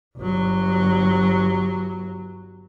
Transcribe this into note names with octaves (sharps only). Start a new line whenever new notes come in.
G1 F#3